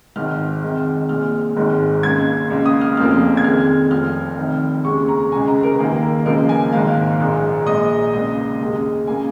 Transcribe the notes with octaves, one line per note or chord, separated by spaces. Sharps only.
G#1 G#2 D#3 F6
F2 D#3 G#3
A#1 A#2 G#3 F6
G#1 G#2 D#3 G#3
C#2 C#3 A#3 G#6
C#2 C#3 A#3
D#6
F6
F1 F2 C#3 F3 A#3 F6
G#6
F2 D#3 G#3 F6
F1 F2 F3 F6
F1 F2 D#3
D#2 C#3 G#3 C#6
A#5
C#2 C#3 G#3 G#5
A#5
A#4
D#2 D#3 A#3 G#4
C#2 C#3 F3 A#3 A#4
G#5
G#1 G#2 D#3 A#3 F5
A#1 G#2 G#3
A#1 A#2 G#3 D#5
C#2 C#3 A#3 D#5
D#2 C#3 G#3
C#3 A#3 G#5